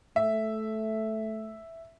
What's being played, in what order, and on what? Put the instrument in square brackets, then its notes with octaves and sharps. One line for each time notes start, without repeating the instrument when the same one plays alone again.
[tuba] A3 [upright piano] E5